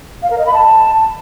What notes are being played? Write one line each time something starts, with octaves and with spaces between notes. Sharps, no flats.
F5
A#4
D#5
B5
A5